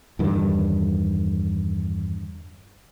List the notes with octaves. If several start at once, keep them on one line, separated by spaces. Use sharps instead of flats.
E2 G2 D3 D#3